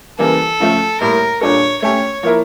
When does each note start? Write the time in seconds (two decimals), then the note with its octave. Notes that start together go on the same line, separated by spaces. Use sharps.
0.19 C#3 E3 G3 A#3 A4
0.60 C#3 F3 A3
1.01 A2 G3 A#3 A#4
1.41 A#2 G3 D4 A4 C#5
1.82 A3 C#4 G4 C#5
2.23 F3 A#3 E4 A#4